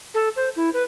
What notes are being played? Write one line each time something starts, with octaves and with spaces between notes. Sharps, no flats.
A4
C5
E4
B4